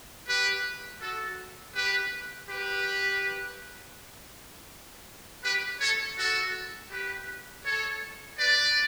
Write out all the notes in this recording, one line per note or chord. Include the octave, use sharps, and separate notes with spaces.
G4 B4
F#4 A4
G4 B4
G4 B4
G4 B4
A4 C#5
F#4 A4
G4 B4
A4 C#5
B4 D5